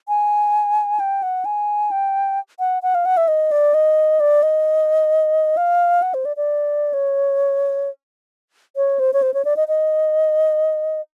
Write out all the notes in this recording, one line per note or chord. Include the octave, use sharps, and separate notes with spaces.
G#5
G5
F#5
G#5
G5
F#5
F#5
F5
F#5
E5
D#5
D5
D#5
D5
D#5
F5
F#5
C5
D5
D5
C#5
C#5
C5
C#5
C5
C#5
D5
D#5
D#5